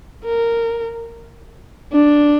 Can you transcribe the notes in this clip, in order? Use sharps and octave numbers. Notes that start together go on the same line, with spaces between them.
A#4
D4